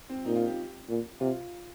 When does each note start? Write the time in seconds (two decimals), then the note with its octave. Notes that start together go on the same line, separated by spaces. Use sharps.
0.10 C4
0.25 A#2 D#4
0.36 F4
0.46 G4
0.89 A#2
1.20 C3 F4